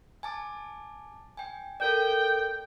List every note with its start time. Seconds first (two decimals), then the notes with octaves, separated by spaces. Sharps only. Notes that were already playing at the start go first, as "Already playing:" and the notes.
0.23 G#5 A5 D6
1.37 G5 G#5
1.80 A4 A#4 D5 G5